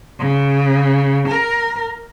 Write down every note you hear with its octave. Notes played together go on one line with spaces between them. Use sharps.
C#3
A#4